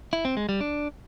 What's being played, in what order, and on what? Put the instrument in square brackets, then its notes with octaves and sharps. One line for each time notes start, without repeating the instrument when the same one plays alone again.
[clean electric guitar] E4
C4
G#3
G3
D4